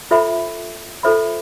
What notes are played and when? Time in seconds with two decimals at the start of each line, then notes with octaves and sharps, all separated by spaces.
0.11 F4 A4 C5 E5 B5
1.03 F4 A4 C5 E5 B5